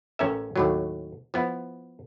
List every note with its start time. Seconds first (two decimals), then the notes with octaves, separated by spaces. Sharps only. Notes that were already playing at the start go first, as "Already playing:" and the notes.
0.19 A1 C#4 A#4 E5
0.56 D#2 A2 F#3
1.34 F3 B3 E4